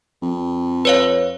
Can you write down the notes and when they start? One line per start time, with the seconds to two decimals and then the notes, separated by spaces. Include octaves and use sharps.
0.22 F2
0.85 B4 C#5 F5